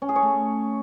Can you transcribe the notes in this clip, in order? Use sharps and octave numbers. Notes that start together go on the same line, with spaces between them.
C#4
G#4
C#5
A3